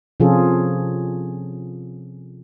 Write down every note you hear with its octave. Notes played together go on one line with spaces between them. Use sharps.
C3 F3 C#4 F4 G#4 A4